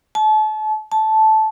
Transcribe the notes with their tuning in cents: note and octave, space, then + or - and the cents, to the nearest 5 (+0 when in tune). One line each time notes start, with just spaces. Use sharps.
A5 -35
A5 -10